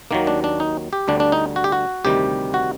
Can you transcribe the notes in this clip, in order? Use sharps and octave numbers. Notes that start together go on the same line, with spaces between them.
D#2 D#3 F#3 A#3
D4
D4
D#4
G4
D2 D3 G3 D4
D4
D#4
F#4
G4
F#4
D2 C3 D#3 G3 G4
F#4